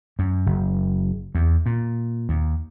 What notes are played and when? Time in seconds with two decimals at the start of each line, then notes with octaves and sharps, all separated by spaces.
0.19 F#2
0.46 F#1
1.35 E2
1.66 A#2
2.29 D#2